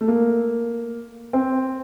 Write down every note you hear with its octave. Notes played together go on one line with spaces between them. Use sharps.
A3
A#3
C4